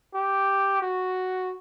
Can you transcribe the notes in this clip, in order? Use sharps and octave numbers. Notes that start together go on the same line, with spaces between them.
G4
F#4